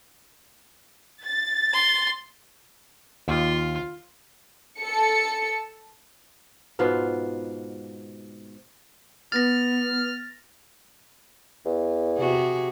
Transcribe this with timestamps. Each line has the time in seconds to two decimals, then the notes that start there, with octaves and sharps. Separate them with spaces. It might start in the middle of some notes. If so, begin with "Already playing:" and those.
1.24 A6
1.73 C6
3.28 D#2 F4
4.80 A4 C#7
6.79 G#2 B2 B3 F4
9.32 B3 F6 A6 A#6
11.65 E2
12.18 C3 F#4 G#4